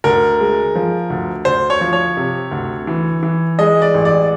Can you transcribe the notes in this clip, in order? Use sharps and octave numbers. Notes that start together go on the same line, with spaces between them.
D2 A#4
G#3
F3
D2
D2 C5
C#5
F3
C#5
C3
D2
E3
E3
G#3 D#5
D5
A1
D5